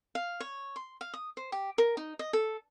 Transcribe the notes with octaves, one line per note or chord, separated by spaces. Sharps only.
F5
C#5
C6
F5
D#6
C5
G4
A#4
D#4
D#5
A4